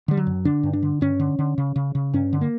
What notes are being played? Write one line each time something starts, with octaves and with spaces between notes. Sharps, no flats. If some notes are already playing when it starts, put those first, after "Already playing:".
D3 G3
F#3
F#2
D3 D4
G2
D4
D3
G2 C#4
D3
D3
C#3
C#3
C#3
G2 C#4
D3
A#3